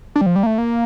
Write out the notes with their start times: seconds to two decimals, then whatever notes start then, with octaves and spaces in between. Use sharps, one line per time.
0.16 D4
0.21 G3
0.26 F3
0.36 G3
0.43 A#3
0.46 A3
0.58 A#3